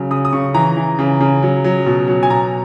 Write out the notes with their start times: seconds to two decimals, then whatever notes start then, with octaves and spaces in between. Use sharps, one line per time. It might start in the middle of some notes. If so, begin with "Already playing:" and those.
Already playing: C#3 F#3
0.11 C#3 D#6
0.25 D#6
0.33 C#3 C#6
0.54 E3 A#5
0.77 E3
0.99 C#3
1.20 C#3
1.43 F#3
1.64 F#3
1.86 B2
2.08 F#3
2.23 G#5
2.30 B2 A#5